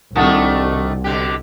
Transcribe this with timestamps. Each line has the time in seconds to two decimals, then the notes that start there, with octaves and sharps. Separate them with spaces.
0.15 C2 D#3 A3 D4 F#4 A5 D#6
1.04 B2 D3 G4